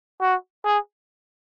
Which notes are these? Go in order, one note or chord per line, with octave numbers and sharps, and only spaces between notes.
F#4
G#4